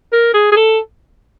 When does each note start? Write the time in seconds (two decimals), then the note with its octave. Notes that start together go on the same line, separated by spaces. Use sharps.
0.12 A#4
0.34 G#4
0.52 G#4
0.56 A4